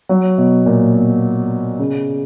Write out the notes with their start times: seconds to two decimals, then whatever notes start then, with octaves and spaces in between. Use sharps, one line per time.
0.09 F#3
0.38 B2
0.66 A#2
0.94 B2
1.79 C#3